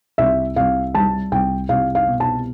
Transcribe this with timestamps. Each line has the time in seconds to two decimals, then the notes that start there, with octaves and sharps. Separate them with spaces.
0.18 C2 E5
0.56 C2 F5
0.94 G3 A5
1.32 C2 G5
1.69 C2 F5
1.95 F5
2.08 B2
2.20 A5